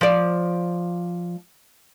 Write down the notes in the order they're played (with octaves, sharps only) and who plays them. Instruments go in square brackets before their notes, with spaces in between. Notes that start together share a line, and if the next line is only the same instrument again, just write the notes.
[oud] F3 D5